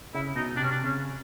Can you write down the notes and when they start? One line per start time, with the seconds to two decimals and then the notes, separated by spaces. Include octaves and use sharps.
0.14 C#3 E4
0.35 B2 D#4
0.56 C3 D4
0.63 C#4
0.71 D4
0.84 C#3 C#4